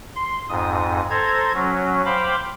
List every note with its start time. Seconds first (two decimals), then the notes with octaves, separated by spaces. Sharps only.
0.16 C6
0.49 F2 G#2 D#6
1.10 A4 C5 A#5 G#6
1.54 F#3 C#4
2.06 C5 F5 G5 B5 D6